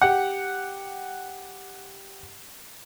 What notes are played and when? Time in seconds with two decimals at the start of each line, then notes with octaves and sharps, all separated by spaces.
0.01 G4 F#5